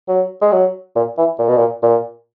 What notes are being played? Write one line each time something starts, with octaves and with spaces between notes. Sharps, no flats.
F#3
G#3
F#3
A#2
E3
A#2
B2
A#2
A#2